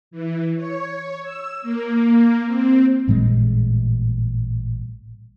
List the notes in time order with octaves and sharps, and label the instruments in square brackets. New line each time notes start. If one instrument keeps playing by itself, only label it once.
[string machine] E3
C#5
E6
A#3
C4
[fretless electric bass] A1 A#2 G3 G#3